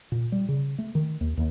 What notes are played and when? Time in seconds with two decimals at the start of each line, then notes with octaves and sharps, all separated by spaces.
0.12 A#2
0.32 G3
0.49 C#3
0.78 A3
0.95 D#3
1.21 D#2
1.37 D#2